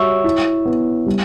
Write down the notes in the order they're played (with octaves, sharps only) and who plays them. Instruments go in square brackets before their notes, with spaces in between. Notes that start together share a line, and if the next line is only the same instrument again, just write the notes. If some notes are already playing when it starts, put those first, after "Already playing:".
Already playing: [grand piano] G3 F#4 [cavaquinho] C#5 E5
[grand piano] E4
B3
G3